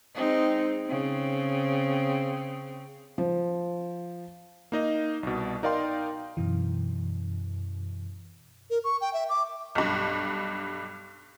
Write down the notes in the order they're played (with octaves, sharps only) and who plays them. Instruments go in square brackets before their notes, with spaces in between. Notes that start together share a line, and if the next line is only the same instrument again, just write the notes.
[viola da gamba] G#3 C4 D#4
C#3 C4
[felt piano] F3
[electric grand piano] A#3 D#4 D#5
C2 B2
D#4 A#4 D5 F5 G5 C6
[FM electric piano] F#2 B2 E3
[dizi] A#4
C#6
G5
E5
D6
[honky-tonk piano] B1 G2